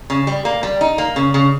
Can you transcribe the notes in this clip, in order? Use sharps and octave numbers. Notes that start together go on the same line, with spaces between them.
C#3
G3
A#3
G3
D#4
A#3
C#3
C#3